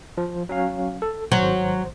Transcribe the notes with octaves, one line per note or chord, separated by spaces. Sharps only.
F3
F#3 C#4 F5
A4
G#1 F#3 C5